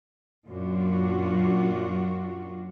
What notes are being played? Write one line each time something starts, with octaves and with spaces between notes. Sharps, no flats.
F#2 A#2 D4 F4 F#4